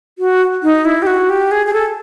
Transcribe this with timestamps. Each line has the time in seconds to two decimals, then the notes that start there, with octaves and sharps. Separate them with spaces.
0.19 F#4
0.63 D#4
0.85 E4
1.02 G4
1.07 F#4
1.30 G4
1.51 G#4
1.66 G#4
1.73 A4